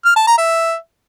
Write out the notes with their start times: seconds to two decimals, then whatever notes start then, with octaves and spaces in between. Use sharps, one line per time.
0.05 F6
0.16 A5
0.27 A#5
0.38 E5